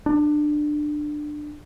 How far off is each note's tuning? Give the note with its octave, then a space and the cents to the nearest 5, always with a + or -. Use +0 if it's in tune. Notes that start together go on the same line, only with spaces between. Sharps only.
D4 +20